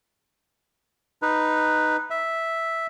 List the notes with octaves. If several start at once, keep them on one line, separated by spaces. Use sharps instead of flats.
D#4 B4
E5